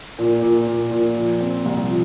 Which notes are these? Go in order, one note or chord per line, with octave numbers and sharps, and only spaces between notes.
A#2
A#2
A#2
A#2
F3
C4
C2
F3